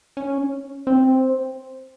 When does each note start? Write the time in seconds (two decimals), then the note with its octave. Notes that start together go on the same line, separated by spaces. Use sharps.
0.17 C#4
0.87 C4